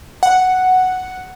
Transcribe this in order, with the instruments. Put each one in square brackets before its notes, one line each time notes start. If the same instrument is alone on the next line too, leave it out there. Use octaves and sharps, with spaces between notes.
[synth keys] F#5